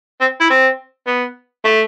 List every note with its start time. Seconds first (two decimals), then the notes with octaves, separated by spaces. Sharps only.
0.21 C4
0.40 E4
0.50 C4
1.07 B3
1.64 A3